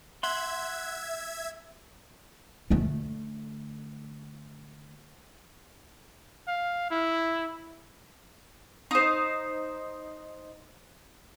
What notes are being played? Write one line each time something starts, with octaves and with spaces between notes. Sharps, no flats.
E5 F#5 C6 G#6
D3 A3
F5
E4
D#4 C5